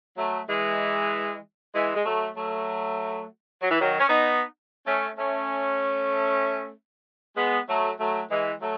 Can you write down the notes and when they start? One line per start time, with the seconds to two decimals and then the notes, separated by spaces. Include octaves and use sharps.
0.17 F#3 A3
0.48 E3 G#3
1.74 E3 G#3
1.95 G#3
2.05 F#3 A3
2.36 F#3 A3
3.61 F#3
3.70 E3
3.79 D#3 F#3
3.99 C#4
4.08 B3 D#4
4.86 A3 C#4
5.17 A3 C#4
7.36 G#3 B3
7.68 F#3 A3
7.99 F#3 A3
8.30 E3 G#3
8.61 F#3 A3